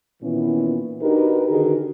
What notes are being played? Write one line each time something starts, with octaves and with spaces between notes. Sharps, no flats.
A#2 D#3 E3 B3 C#4 E4
D4 D#4 F#4 G4 A#4 B4
D3 D#3 D#4 F#4 G#4 A#4